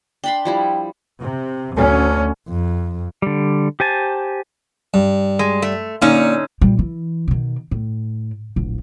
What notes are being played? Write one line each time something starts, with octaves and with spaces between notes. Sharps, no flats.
D4 G5 B5 C6
F3 G3 E4
C3
D2 C#4
F2
D3 G3
G4 C5 G#5 A5
G2
G#3
A3
A#2 D3 C#4 D#4
A#2 G3
E3
B2 D#3
A2
D1 A#1